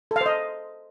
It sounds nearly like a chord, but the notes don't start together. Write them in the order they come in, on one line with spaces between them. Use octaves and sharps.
A4 F5 C5 D#5